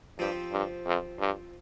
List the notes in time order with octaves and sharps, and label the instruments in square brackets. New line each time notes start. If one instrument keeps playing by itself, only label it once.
[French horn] G2 [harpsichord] F3 C4 G4
[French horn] G2
F2
G2